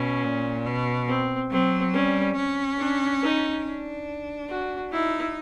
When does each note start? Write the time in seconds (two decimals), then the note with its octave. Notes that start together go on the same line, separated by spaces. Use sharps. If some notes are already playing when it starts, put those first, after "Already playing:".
Already playing: B2 C#4
0.24 A#2
0.66 B2
1.08 C4
1.51 F#3 C4
1.93 G3 C#4
2.36 C#4
2.78 D4
3.22 D#4
3.64 D4
4.49 F#4
4.92 D#4 E4